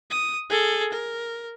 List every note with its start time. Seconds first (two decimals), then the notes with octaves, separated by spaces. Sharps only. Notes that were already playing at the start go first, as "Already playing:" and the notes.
0.11 D#6
0.50 G#4 A4
0.92 A#4